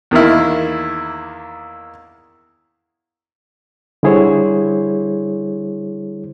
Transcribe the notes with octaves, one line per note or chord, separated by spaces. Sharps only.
E2 D#3 A#3 E4
D3 G3 E4 G#4 C5 C#5